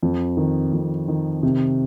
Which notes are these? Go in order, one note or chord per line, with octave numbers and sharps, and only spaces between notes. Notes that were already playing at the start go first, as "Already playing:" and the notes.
F2
D#3
F2
D#3
C3